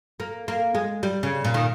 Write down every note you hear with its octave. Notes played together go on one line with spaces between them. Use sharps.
A#3
A#3
G#3
G3
C#3
A#2
D#3